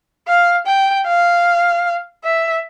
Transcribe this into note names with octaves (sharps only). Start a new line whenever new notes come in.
F5
G5
F5
E5